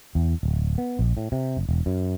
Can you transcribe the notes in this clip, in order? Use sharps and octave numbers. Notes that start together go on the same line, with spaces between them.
E2
D1
B3
A#1
A2
C3
F#1
E1
F#2